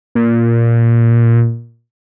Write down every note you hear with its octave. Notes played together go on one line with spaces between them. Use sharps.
A#2